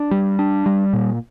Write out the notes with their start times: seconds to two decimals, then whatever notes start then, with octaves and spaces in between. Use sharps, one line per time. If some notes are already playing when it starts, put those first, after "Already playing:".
Already playing: D4
0.11 G3
0.39 D4
0.66 G3
0.93 A#2